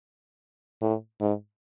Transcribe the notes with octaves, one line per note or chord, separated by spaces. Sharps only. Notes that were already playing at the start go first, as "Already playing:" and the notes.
A2
G#2